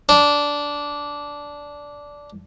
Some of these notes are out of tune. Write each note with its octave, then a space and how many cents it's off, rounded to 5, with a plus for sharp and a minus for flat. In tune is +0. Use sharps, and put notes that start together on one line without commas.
D4 -10